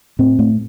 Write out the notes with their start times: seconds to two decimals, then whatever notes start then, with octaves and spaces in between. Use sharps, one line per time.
0.19 A2 C4
0.39 A2